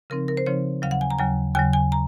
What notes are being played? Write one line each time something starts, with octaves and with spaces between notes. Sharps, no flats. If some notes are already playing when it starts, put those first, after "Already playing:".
C#3 F3 C4 D#4 A#4
A#4
C5
C#3 F3 C4 D#4 C#5
D#2 C#3 F#3 F5
F#5
G#5
A#5
D#2 C#3 F#3 G#5
D#2 C#3 F#3 G#5
G#5
A#5